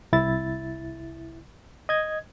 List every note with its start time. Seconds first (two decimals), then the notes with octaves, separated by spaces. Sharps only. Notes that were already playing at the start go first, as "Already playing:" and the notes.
0.13 C2 E4 A6
1.89 D#5 G#6